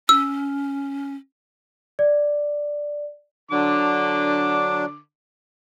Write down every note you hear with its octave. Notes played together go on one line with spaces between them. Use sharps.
C#4 E6
D5
D3 F#3 D4 D6